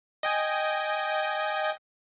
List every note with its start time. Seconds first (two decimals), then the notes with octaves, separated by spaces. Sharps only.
0.23 D#5 G5 G#5